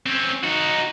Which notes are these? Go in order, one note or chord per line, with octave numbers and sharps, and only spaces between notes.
C4 C#4
D#4 F#4